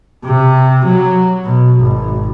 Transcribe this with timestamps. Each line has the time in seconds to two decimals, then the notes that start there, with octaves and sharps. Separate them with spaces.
0.25 C3
0.85 F#3
1.44 B2
1.80 G#1